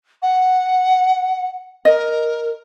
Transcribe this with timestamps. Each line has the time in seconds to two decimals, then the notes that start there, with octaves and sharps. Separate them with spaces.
0.22 F#5
1.85 A#4 D#5